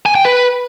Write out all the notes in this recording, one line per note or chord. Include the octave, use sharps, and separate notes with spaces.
G#5
G5
B4